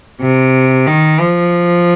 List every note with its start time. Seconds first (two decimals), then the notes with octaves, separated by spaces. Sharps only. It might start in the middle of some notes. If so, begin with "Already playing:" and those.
0.21 C3
0.87 D#3
1.20 F3